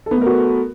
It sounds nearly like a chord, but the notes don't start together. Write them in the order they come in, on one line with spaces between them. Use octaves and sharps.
A4 B3 A3 A#4 F#4